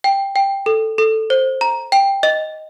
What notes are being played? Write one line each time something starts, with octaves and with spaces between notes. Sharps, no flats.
G5
G5
A4
A4
C5
A#5
G5
D#5